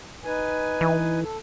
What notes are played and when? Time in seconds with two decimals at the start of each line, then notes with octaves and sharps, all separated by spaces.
0.25 D#4 B4 G#5
0.81 E3
1.22 A4